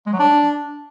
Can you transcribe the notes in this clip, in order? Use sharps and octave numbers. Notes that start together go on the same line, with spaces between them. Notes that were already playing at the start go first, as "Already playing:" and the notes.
G#3
F#3
D4